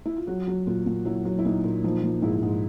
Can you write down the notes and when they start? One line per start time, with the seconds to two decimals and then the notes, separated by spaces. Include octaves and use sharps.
0.06 E4
0.16 F4
0.27 F#3 F#4
0.47 F#3
0.67 A#2 F4
0.86 A#2
1.05 F#3 E4
1.25 F#3
1.39 E4
1.45 A#2 D#4
1.64 A#2
1.84 F3 D#4
2.03 F3
2.22 G#2 E4
2.42 G#2